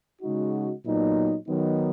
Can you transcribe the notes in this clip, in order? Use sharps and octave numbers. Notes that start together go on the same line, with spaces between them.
C#3 G#3 D#4 F#4
A#2 F#3 B3 D#4
D#3 F#3 B3 D#4